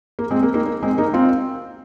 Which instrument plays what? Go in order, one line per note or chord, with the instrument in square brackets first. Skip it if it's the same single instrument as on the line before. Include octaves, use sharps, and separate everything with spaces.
[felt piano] A#3
G#3 C4
A#3
A#3 D#4
A#3
G#3 C4
A#3 D#4
C4 F4